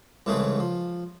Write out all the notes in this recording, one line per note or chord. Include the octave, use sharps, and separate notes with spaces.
C2 G#2 C#3 E3 A3 G#4
F3